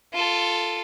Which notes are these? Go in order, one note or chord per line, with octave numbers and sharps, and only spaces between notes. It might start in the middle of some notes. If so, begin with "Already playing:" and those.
F4 A4